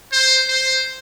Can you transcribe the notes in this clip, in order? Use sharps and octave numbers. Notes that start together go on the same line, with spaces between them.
C5
C5